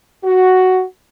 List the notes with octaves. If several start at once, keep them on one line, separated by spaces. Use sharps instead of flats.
F#4